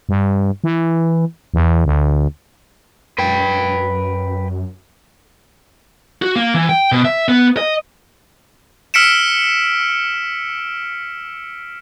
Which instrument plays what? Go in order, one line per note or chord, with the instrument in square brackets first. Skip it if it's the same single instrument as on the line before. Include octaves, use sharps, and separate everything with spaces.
[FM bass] G2
E3
E2
D2
[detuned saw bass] F#2 [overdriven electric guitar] B4 G5
[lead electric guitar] F#4
A#3
E3
G5
B2
E5
B3
D#5
[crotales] E6 F6 B6 C#7 D7 E7